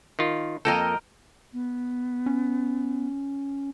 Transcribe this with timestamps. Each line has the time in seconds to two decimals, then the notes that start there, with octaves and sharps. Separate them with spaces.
0.19 D#3 F4
0.65 F2 A#3 A4 A#4 D#5 G5
1.53 B3
2.26 C#4